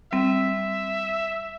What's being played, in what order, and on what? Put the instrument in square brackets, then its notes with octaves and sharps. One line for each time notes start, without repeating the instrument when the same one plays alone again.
[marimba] G3 C4 [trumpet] E5